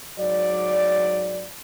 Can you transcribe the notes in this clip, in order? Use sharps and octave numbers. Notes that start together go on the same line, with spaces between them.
G#2 F#3 D5